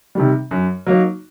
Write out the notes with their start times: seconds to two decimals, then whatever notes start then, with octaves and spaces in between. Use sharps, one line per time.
0.15 C3 D#3 G3
0.51 F#2
0.87 F#3 A#3 D#4